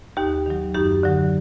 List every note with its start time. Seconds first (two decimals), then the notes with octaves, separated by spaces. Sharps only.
0.17 D#2 D#4 G4
0.46 D#3 F#3
0.74 F#2 D#4 G4
1.03 D3 F#3